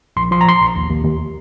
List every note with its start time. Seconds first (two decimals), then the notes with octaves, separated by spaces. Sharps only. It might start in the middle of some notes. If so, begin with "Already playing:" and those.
0.17 A#1 C6
0.31 F3 C6
0.41 A#5
0.46 A#1 C6
0.61 A#1
0.76 D#2
0.90 D#2
1.05 D#2